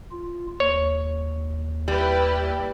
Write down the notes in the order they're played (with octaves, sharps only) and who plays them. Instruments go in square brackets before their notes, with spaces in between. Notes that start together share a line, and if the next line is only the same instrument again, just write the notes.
[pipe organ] F4
[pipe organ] D#2 [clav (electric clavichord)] C#5
[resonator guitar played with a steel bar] G3 [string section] E4 G4 B4